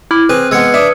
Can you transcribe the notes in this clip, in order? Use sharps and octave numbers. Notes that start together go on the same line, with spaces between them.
E4 D6 F6
C4 G#4 B4
G#3 B3 E6 G#6 C#7
D4 E5 D#6